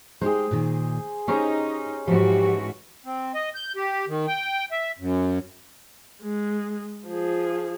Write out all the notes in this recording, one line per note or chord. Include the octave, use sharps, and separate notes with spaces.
G#3 D#4 G4 G#4 C5
A#2 D#3
C#4 D#4 G4 G#4 C5 A#5
G#2 E3 F3 F#4 G4
C4
D#5
G6
G4
D#3
G5
E5
F#2
G#3
F3 G#4